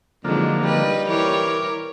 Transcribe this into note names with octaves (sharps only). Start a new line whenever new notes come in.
F2 D3 D#3 F3 F#3 G#3 A#3
G3 B4 D#5
E3 A#4 C#5 D6